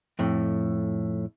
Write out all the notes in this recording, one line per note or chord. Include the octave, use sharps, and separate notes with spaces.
F2 A2